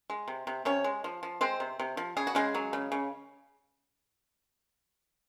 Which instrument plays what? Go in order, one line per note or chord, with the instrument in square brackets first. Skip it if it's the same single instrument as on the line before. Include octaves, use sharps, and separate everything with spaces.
[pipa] G#3
C3
C3
C3 C#4 C#5
G#3
F3
F3
G#3 C4 C5
C3
C3
F3
C#3 G#4
F#4
C#3 G#3 G#4
F#3
C#3
C#3